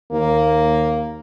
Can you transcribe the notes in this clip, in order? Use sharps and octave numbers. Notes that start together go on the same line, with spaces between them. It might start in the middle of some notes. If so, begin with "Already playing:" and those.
D#2 A#3